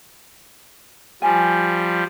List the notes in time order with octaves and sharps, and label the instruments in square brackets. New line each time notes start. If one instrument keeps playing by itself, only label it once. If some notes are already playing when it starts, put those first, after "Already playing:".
[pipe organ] F3 G3 [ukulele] G#5